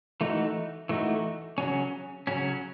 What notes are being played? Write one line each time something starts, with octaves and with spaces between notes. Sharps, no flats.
E3 A3 D#4 F#4
E3 A3 D#4 F#4
C#3 F#3 C#4
C#3 F#3 C#4